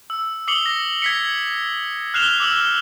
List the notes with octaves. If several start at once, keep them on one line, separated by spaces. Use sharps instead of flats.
E6
D6 D#6 C7 C#7 F#7 G7
A#6
G#6 B6 C#7
F6 F#6 C7 E7 F7 G7
D6 E6 F#7